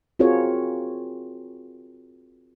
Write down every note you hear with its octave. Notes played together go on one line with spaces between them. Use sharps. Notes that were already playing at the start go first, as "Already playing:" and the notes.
C4 F4 F#4 G#4 A#4 C#5